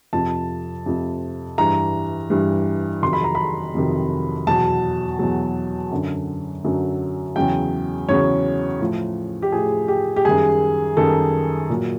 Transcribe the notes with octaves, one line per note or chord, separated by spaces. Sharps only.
F2 C3 F3 A5
F2 C3 F3
G2 E3 G3 A#5
G2 E3 G3
F2 C3 D#3 F#3 C6
B5
A#5
B5
F2 C3 D#3 F#3
E2 B2 F#3 A5
E2 B2 F#3
F#2 D3 F#3
F#2 D3 F#3
E2 C#3 F#3 G5
E2 C#3 F#3 C#5
A2 F3
G4
A2 F3 G#4
G4
G4
F#2 D#3 G3 G#4
F#2 D#3 G3 A4
A#2 F#3